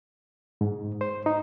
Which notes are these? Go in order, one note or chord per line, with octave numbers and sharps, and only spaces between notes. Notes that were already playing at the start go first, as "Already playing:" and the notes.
G#2
C5
D#4